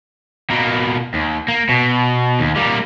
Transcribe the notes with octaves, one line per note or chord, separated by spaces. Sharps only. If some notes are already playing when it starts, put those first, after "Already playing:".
B2 A#3
D#2
A#3
B2
D#2
G3 A#3